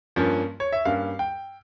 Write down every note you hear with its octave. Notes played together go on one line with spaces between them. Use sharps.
G2 F3 A#3 C#4
C#5
E5
G2 G3 A#3 C#4 F5
G5